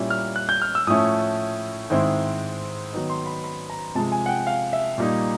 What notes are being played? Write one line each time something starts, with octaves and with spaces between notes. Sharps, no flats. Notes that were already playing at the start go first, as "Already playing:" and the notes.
Already playing: A#2 G3 A#3 C#4 E4
F6
F#6
G6
F6
E6
A2 F3 A3 C#4 E4 D#6
G#2 D#3 G#3 C4 E4
D#3 F#3 B3 D#4
C6
B5
B5
A#5
C3 F3 G#3 A5
G#5
F#5
G5
F5
E5
A#2 G3 A#3 D#4